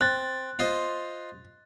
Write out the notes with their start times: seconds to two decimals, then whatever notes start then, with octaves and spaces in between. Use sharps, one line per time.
0.01 C4 F#6 A6
0.59 F4 C5 D#5